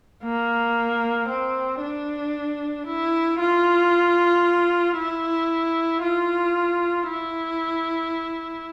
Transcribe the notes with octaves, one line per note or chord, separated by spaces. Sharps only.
A#3
C4
D4
E4
F4
E4
F4
E4